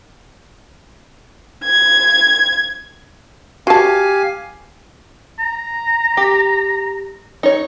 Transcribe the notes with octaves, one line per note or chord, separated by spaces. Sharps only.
G#6
F#4 G4 F5 G#5 A5
A#5
G4
D#4 C#5